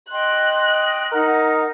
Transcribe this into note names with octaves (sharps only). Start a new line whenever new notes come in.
D#5 G5 C6 F#6
D#4 A#4 F#5